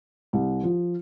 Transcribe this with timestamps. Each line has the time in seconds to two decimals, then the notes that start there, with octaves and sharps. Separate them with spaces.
0.33 C2
0.63 F3